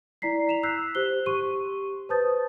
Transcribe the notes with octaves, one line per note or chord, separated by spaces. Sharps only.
E4 D5 A#5 B6 C7
A#5 E7 F7
E6 F#6 G6 B6 C7
G4 C5 F#6 G7
G4 C6 C#6 D#7
B4 C5 A5 D#6 G6 A6